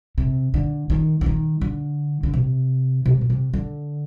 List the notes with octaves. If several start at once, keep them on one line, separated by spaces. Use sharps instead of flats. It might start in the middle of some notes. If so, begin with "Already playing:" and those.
C3
D3
D#3
D3
D#3
D3
D3
C3
C3
A#2
C3
D3